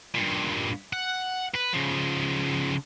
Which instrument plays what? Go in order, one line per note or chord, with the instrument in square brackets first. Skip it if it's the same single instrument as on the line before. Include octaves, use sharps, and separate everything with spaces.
[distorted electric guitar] G2 A#2
F#5
B4
C#3 F3